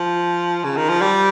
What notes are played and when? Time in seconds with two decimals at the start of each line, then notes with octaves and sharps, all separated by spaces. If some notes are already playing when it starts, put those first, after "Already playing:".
Already playing: F3
0.64 C#3
0.77 D#3
0.89 F3
1.01 G3